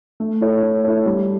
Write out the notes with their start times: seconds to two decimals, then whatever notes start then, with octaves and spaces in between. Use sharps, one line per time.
0.20 A3
0.41 E4 A4 C#5
0.63 A3
0.84 E4 A4 C#5
1.06 G3